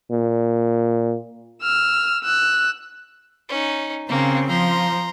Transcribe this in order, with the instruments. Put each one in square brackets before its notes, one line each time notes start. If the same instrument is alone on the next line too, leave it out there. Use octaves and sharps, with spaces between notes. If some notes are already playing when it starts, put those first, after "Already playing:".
[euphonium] A#2
[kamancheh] E6 F6
E6 F#6
[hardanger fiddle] C#4 D#4
[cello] C#3 C4 [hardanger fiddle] A#3
[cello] F3 [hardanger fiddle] A#5 C6